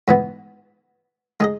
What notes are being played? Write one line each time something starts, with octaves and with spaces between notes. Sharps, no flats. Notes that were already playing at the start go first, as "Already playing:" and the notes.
G#2 E3 B3
G#3 D#4 G#4 D#5